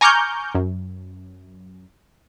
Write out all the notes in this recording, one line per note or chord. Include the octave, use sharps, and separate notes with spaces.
G#5 A#5 C#6 D6 F6 G6
F#2